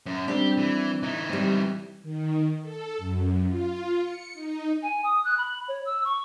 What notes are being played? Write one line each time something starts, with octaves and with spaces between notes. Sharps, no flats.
F#2
G3 C4 D4 G4
E3
E3 D#4
G3 C4
D#3
A4
F#2
F4
C#7
D#4
G#5
D#6
F#6
B5
C#5
E6
C#6